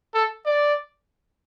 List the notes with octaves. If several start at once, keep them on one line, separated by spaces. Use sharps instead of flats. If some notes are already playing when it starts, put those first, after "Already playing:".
A4
D5